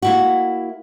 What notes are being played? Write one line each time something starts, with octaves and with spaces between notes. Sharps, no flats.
A#3 E4 F#4